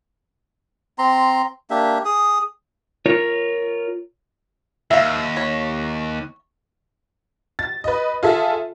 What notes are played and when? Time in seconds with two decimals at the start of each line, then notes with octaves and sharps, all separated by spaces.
0.98 C4 A#5 C6
1.70 A#3 D4 G4 E5
2.05 G#4 D#6
3.06 F4 A#4 C#5
4.91 D#2 E5 F5
5.37 C#5
7.59 A6
7.84 B4 D#5
8.23 F4 G#4 A4 E5